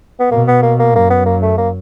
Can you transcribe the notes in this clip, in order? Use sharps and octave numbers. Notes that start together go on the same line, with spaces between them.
B3
B2 A#3
B3
A#3
A#3
F#2 A#3
B3
A#3
A3
A#3